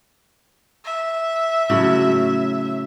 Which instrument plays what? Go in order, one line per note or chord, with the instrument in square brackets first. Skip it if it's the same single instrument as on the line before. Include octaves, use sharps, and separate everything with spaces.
[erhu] E5
[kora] A2 C#3 F#3